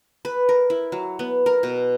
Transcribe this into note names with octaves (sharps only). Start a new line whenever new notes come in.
B4
A#4
E4
F#3
B3
A#4
B2